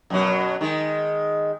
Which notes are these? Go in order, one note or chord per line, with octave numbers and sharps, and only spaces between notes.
F#2 B2 F#3
D#3 G#3